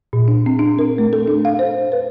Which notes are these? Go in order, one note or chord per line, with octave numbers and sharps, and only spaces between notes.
A#2
D4
C4
D4
A#4
A3
A4
D4
F5
C5
B4